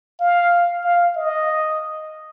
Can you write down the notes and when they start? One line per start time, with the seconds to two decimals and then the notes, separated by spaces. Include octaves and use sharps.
0.20 F5
0.84 F5
1.15 D#5